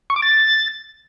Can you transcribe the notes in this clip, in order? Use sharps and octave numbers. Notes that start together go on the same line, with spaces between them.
C#6
D6
A6